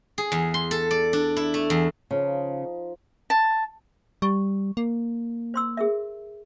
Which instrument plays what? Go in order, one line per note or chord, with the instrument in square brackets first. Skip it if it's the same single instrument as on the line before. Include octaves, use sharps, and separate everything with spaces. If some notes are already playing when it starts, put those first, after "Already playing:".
[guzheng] G#4
E2
C6
A4
D5
D4
E4
A3
E2
[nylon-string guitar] C#3 [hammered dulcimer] F3 D#4
[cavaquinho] A5
[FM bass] G3 [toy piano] C#6
[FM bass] A#3
[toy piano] C5 C6 E6
G#4 A#4 E5